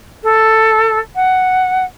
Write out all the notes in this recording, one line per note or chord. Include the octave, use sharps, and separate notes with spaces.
A4
F#5